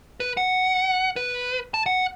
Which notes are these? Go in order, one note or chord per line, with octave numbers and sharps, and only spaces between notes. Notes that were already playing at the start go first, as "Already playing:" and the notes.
B4
F#5
B4
A5
F#5